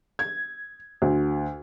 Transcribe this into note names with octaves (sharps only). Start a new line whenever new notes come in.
G#6
D2